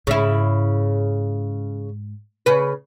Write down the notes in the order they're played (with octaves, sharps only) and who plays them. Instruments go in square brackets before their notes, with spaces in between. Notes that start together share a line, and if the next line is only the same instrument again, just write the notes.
[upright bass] G#2 [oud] C#3 E4
[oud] C#3 B4